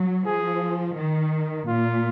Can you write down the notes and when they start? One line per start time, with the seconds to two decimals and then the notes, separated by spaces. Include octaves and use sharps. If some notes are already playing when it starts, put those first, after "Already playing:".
Already playing: F#3
0.26 F3 G#4
0.97 D#3
1.67 A#2 F4